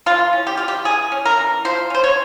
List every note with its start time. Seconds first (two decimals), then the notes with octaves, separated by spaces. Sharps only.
0.06 E3 F4
0.33 C#4
0.47 G4
0.57 E3 F4
0.68 G4
0.85 E3 G#4
1.12 C#4
1.25 A#4
1.37 E3
1.65 F3 C5
1.90 C#4 C5
2.04 C#5